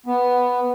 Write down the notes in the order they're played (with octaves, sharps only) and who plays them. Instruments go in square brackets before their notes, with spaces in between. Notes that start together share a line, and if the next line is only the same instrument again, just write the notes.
[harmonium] B3